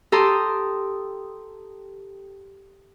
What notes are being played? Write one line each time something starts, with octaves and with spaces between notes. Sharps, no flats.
G4 A4 A#5 C6 D#6